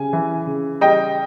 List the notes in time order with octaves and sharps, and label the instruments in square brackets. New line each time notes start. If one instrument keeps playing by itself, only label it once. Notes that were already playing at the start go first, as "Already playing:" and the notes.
Already playing: [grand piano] C#3 G3 G#5
E3
C#3
G3 D#5 G5